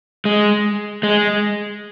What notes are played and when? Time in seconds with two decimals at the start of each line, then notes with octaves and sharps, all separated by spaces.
0.25 G#3
1.03 G#3